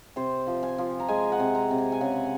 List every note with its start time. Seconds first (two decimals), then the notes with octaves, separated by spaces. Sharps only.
0.16 C3 C5
0.47 F3
0.63 G#5
0.78 F3
1.00 A#5
1.08 G#3 G#5
1.32 F#5
1.40 C3
1.55 A#5
1.71 C3
1.78 G#5
1.92 G#5
2.01 C#3 F#5